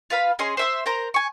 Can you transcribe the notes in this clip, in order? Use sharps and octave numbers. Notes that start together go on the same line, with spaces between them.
F4 B4 F5 B5
C#4 G#4 D#5 C6
C5 E5 C6
A#4 C5 A#5
G#5 C#6